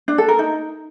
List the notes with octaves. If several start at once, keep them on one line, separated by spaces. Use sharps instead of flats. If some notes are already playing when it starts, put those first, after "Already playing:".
D4
A4
A#4
D#4